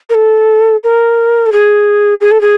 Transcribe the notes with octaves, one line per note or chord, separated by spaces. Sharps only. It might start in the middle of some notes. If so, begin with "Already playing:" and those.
A#4
A4
A#4
A4
G#4
G#4
A4
G#4